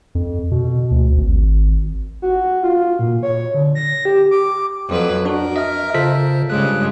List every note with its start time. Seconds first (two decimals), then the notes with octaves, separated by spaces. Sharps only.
0.15 F2
0.52 B2
0.91 D2
1.17 G#1
2.22 F#4
2.63 F4
2.99 A#2
3.23 C#5
3.54 D3
3.75 A#6
4.05 G4
4.31 D6
4.89 F2 F#3 B4
5.25 D4 F#4 A#4 B4
5.56 D#5 E5 F6
5.94 C#3 F4 A4 C5 B6
6.50 G2 C#3 G#3 F#6